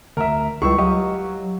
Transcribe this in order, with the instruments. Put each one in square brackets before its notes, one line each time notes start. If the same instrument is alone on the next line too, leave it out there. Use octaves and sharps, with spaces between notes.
[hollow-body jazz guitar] D2 [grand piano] A#4 E5
[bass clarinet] C#2 [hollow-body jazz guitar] G3 E4 G#4 [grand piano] C#6 E6
[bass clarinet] F#3 [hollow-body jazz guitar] G4 D#5 F5